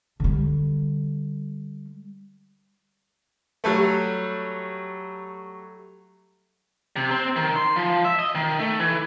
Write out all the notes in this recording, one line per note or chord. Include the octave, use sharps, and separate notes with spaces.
D3 G3
F#3 G3 A3
C3
C4
D#3
C6
F3
E5
D#5
D#3
A3
E3